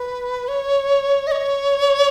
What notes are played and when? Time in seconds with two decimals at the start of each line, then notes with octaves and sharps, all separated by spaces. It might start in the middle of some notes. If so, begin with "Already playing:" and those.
Already playing: B4
0.48 C#5
1.27 D#5
1.32 C#5